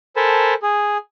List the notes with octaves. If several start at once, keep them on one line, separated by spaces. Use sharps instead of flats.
A4 A#4 C5 G#5 A5 B5
G#4